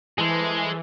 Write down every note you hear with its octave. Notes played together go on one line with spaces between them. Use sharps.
E3 G#3 G#4 A4 C5